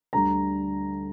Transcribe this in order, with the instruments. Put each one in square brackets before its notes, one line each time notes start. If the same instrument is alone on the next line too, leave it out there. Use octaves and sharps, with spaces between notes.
[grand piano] D2 D3 G3 A#5